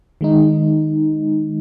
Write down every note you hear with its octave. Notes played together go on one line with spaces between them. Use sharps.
D#3 G#3 D#4